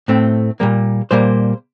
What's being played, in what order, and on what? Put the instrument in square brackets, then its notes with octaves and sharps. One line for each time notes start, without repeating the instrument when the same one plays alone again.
[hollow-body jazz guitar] A2 A3 C4
A#2 G3 A#3
A#2 G3 A#3 C5